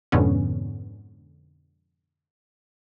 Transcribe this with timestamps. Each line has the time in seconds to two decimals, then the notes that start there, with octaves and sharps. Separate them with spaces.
0.12 F2 G#2 B2 D3 B3 C#4